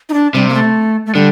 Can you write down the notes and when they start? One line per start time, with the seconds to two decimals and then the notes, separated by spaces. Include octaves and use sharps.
0.09 D#4
0.14 D4
0.34 C3 G3
0.49 A#3
0.54 A3
1.06 A3
1.15 D3 G3